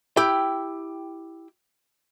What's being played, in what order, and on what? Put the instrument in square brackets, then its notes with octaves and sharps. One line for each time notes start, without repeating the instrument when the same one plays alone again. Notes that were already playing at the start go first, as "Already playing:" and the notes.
[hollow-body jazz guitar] E4 G4 G5